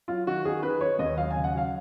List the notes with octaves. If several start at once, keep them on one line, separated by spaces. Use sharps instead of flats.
F#3 F4
D#3 F#4
D#3 G#4
D#3 B4
D#3 C#5
D#2 D#5
F#3 F5
G#5
C#3
F#5
F#3 F5